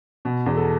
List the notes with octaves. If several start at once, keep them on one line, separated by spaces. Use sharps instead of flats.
B2
E2
A4